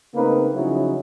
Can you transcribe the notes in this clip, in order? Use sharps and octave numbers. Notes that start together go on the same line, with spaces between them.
C#3 A3 A#3 C4 D#4 B4
C#3 F3 F#3 C#4 D#4 E4